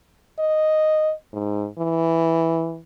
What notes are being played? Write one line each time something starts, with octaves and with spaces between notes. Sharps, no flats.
D#5
G#2
E3